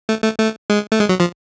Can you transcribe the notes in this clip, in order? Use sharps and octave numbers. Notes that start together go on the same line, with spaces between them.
A3
A3
A3
G#3
A3
G#3
F#3
F3